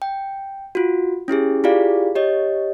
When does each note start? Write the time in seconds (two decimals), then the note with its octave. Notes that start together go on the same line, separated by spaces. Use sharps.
0.02 G5
0.75 F4 F#4
1.28 C#4 E4 G4 G#4
1.64 E4 F4 G4 G#4 D5 F5
2.15 G4 C#5 D#5